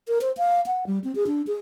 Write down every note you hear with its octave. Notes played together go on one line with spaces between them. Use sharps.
A#4
C5
F5
F#5
G3
C4
G#4
D4
G#4